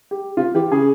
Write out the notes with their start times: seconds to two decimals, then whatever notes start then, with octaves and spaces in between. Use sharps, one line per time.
0.11 G4
0.37 C3 F4
0.55 E3 G4
0.72 C#3 G#4